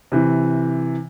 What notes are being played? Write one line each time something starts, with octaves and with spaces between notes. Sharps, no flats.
C3 E3